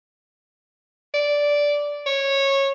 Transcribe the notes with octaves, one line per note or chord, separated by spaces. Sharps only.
D5
C#5